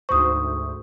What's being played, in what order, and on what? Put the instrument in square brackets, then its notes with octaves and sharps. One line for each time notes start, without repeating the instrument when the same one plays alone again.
[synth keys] D2 G#2 C5 [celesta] C#6 D#6